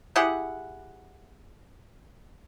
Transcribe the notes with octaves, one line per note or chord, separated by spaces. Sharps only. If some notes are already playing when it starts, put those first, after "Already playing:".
E4 G4 G#4 F#5